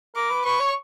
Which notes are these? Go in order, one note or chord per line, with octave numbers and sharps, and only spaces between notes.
A#4 D6
B4
B4 C#6
C#5